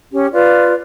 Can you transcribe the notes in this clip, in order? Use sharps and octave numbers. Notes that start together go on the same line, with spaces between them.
C#4 G4
F4 B4 D5